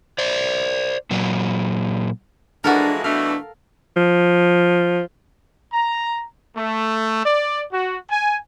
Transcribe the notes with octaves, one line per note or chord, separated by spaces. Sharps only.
C5 D5
A#2 F#3
E3 F3 G#3 D4 F#4 A4 A#4
B2 E3 A3 D4 F5
F3
A#5
A3
D5
F#4
G#5